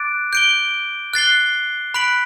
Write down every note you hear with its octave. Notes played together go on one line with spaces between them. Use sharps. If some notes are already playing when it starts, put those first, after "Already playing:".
Already playing: D6 F#6 A6 D7
G6 D7 G7
F#6 A6 C7 G7
B5 F#6 B6 D7 F#7